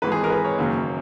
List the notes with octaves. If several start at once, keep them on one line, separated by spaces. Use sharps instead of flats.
G#1 G#2 E3 G#3 B4
G#4
A#4
B4
C#5
F#1 F#2 D#3 A#3 C#4